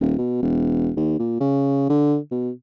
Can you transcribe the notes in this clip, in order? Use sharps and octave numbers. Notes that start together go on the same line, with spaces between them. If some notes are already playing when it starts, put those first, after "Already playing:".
D#1
B2
E1
D#2
A#2
C#3
D3
B2